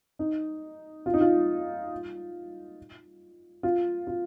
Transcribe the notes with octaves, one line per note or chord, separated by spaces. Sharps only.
D#4
F4
D#4
F4
F4
F4